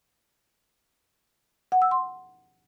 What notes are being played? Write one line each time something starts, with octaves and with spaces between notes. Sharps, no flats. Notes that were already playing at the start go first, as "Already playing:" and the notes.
F#5
E6
C6